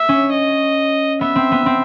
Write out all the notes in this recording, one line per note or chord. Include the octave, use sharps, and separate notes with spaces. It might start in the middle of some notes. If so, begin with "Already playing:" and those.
Already playing: E5
C#4
D#5
B3 E5
C4
B3
C4